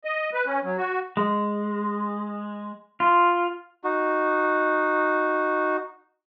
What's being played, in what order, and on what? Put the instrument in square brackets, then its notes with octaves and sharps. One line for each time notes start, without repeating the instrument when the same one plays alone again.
[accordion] D#5
B4
C#4
F#3
F#4
[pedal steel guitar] G#3
F4
[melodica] D#4 F#4